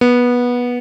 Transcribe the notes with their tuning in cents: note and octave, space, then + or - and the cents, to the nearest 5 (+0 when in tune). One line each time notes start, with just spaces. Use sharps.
B3 -15